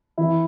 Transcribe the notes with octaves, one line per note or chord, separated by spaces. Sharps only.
E3 E4